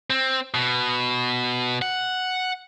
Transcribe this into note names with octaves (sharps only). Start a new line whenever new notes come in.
C4
B2
F#5